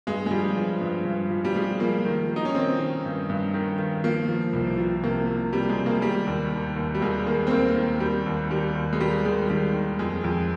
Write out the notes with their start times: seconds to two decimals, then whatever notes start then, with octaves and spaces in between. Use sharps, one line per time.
0.07 G2 G#3
0.26 G#3
0.31 F3 G3
0.56 F3
0.81 G2
1.05 G2
1.31 F3
1.45 G3
1.55 F3 G#3
1.80 F3 A#3
2.05 D#3
2.30 D#3
2.36 D#4
2.45 C#4
2.55 D#3 C4
2.79 D#3
3.05 G2
3.30 G2
3.54 D#3
3.78 D#3
4.04 F3 A#3
4.28 F3
4.53 C2
4.78 F3
5.03 C3 A#3
5.27 C3
5.53 C3 G3
5.69 G#3
5.77 C3
5.86 A#3
6.02 D#3 G3
6.27 D#2
6.52 D#3
6.76 D#2
6.95 G3
7.01 D#2 G#3
7.26 D#3 A#3
7.47 C4
7.51 D#2 A#3
7.76 D#3
8.00 D#2 G3
8.26 D#2
8.50 D#3 G3
8.75 D#2
8.93 G#3
9.00 D#3 G3
9.25 D#3 G#3
9.50 D#3 G3
9.74 D#3
9.99 F2 G#3
10.24 F2